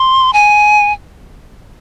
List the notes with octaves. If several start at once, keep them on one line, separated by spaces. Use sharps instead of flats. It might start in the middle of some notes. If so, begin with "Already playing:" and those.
Already playing: C6
G#5